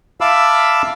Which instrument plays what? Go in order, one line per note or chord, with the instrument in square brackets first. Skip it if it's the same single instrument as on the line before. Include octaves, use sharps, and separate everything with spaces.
[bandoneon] E5 F5 A5 B5 D6 E6